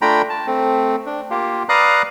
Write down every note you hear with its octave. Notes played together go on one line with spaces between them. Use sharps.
A3 D4 F4 G5 A#5 B5
A5
A3 C4
D4
A#3 F4 G4
B4 D5 F5 A#5 D#6 F#6